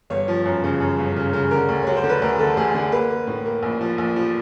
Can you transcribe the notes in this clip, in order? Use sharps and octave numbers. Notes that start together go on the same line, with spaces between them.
G1 C#5
F3
F#2
C#3
F#2
G1
C#3
C#3
D3 A#4
D2
F#3 C#5
C5
D3
B4
D2 A#4
D3 A4
D2 G#4
D3 G#4
A#3 B4
A#3
A2
A#3
A#1
F3
A#1
F3